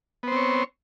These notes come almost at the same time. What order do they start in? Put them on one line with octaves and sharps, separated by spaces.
B3 C5 C4 C#5